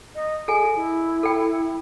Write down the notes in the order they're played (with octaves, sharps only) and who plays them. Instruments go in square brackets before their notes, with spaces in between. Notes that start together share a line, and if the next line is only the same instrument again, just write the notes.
[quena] D#5
[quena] G#4 [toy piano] A4 G#5
[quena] E4
[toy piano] A4 G5